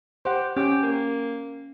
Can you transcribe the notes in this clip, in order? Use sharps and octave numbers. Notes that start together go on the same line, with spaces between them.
G4 C5 F#5
C#4 G4 G5
A#3